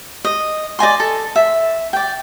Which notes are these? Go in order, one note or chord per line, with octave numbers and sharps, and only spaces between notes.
D#5
D5 D#5 G#5 C6
A4
E5
D5 G5